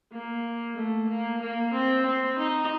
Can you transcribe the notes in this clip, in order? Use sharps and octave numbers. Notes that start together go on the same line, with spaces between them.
A#3
A3
A#3
A#3
C4
C4
D#4